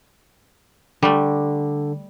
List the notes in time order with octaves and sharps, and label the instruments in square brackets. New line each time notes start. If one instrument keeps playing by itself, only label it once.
[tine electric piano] D3 [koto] G3 A3